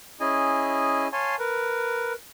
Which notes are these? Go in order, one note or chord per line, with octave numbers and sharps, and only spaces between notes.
C#4 E4 G#4 D#5 G#5
C#5 F5 G#5 A5 C6
A#4 B4